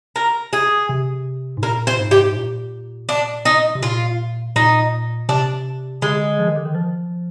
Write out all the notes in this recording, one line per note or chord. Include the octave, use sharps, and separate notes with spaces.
A#4
G#4
C3
G#2
A#2 A#4
A#2 C5
G#2
G4
G#2
A#2
D4
D#4
C3
A#2 F4
A#2 D#4
C3 D4
D3 G#3
F3
D#3
D3
D#3
F3